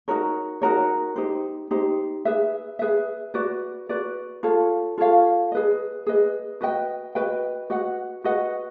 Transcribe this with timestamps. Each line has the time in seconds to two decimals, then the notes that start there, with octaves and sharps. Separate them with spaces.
0.08 D#4 F#4 A#4 C#5
0.62 D#4 F#4 A#4 C#5
1.16 D#4 G4 C5
1.71 D#4 G4 C5
2.25 G#4 B4 E5
2.79 G#4 B4 E5
3.34 F#4 B4 D5
3.89 F#4 B4 D5
4.43 F4 A4 C#5 F5
4.98 F4 A4 C#5 F5
5.52 G#4 B4 D#5
6.07 G#4 B4 D#5
6.61 F#4 B4 D#5 G5
7.15 F#4 B4 D#5 G5
7.70 F#4 B4 D#5 F#5
8.24 F#4 B4 D#5 F#5